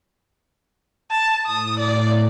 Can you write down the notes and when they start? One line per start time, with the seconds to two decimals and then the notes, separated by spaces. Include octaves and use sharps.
1.11 A5
1.46 A2 D#6
1.79 D5